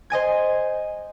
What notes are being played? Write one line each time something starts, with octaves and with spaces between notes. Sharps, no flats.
C5 D#5 G#5 G#6